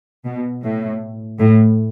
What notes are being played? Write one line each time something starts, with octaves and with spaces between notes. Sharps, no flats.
B2
A2
A2